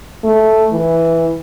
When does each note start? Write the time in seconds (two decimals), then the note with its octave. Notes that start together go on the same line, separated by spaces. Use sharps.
0.24 A3
0.72 E3